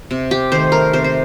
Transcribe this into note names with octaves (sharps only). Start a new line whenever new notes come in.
C3
G4
D#3 A3 C5
A#4
C3 C5
C5